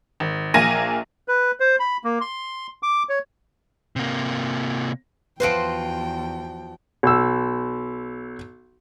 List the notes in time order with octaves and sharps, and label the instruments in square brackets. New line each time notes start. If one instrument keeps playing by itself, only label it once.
[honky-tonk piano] G#1
A#1 A#3 G#5 A#6 D#7
[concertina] B4
C5
B5
A#3
C6
D6
C#5
[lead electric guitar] C3 A#3
[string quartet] E2 G5 [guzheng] F3 F#4 C5 [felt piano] B4 D7
[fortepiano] B1 E6